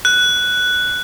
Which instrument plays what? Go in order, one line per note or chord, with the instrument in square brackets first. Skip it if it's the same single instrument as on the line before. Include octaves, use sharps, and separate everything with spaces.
[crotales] F#6